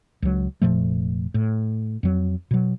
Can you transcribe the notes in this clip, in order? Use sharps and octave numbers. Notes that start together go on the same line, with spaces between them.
C#2 F#3
F1 A#2 F3 A3
A2
F2 F#3
B2 F#3